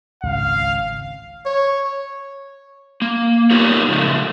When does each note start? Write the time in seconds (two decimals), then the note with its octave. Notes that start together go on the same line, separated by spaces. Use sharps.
0.23 G#1 C#2 F5
1.46 C#5
3.02 A#3
3.51 B3 D#4 F4 G4 A#4 C#5
3.89 A#2 C#3 F3 G#3 A3